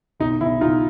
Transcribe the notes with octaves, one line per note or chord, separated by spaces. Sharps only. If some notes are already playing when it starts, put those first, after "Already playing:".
B1 D#4
B1 E4
B1 D#4 F4